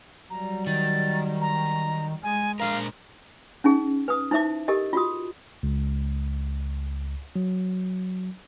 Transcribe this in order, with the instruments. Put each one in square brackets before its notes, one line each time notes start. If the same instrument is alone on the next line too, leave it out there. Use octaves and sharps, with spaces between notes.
[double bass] F#3 G3 [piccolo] A#5
[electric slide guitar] D#3 [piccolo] A6
[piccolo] A#5
[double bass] G#3 [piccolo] G#5
[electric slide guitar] A#2 D4 A#4 [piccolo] F5
[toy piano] C#4 D#4 G#4
B4 D#6
D#4 E4 C5 E5 D6
G4 A4 A#4 D#5
F4 F#4 D#6
[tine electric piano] C#2
F#3